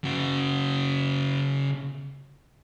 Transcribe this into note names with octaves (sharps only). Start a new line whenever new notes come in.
C#3 F#4